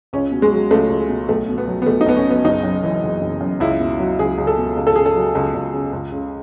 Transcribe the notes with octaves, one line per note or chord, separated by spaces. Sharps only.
C#2 C#4
B2
G#3
F#3
C#2 A3
C#2
B2
B1 A3
B2
B3
F#3
B3
B1 A3
D#4
B1 B3
C#4
B2 B3
F#1 D#4
F#2
E3
F#1
F#1
F#2
C#2 E4
B2
F#3
C#2 G#4
C#2
A4
B2
C#2
A4
C#3 G#4
A4
F#3
C#2
C#2
C#3
C#2
C#3